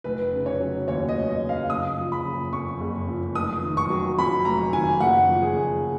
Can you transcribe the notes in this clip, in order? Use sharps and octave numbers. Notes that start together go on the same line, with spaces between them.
F1 B4
C#3
C#5
F#3
D#2 C#5
D#5
F1
D#5
C#3
F5
F#1 D#6
F3
B5
F#1
F2 C#6
F#1
F3
F1 D#6
D#3
C#6
F#3
F2 B5
F1 A#5
D#3 G#5
F#1 F#5
F3
G#4
F#1